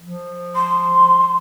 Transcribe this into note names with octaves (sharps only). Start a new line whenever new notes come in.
F3
C6